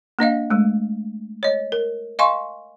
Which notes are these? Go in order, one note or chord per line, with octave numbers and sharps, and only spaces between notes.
A#3 D4 D#5 F5
G#3 A3
C#5 D#5
A#4
D#5 F5 G#5 C6 C#6